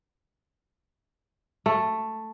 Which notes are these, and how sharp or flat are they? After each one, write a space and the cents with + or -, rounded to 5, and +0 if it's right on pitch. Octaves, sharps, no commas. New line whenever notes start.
A3 +5